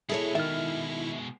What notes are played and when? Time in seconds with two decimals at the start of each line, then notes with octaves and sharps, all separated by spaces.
0.09 B2 G#3 E4 G#4 A4 C#5
0.35 D#3 E5 F6